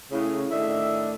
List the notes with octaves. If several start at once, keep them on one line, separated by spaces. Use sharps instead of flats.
A2 C#3
A2 D#3 A3 D4 D#5 E5